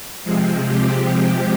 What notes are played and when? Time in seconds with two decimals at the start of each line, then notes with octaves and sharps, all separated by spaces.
0.24 C3 F3 G#3 C4
0.66 G4